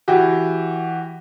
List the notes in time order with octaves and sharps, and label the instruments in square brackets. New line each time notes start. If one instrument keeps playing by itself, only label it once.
[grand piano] E3 F#4 G4